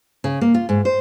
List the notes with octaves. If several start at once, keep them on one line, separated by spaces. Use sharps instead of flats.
C#3
A#3
F4
G#2
C5